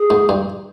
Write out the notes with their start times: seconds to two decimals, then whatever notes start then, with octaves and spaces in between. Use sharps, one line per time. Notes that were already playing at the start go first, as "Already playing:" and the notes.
Already playing: G#4
0.10 G#2
0.29 G2